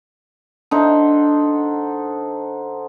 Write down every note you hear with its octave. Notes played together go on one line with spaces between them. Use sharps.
D3 D#4 C5